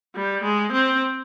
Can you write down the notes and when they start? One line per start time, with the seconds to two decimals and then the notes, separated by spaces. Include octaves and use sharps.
0.15 G3
0.44 G#3
0.72 C4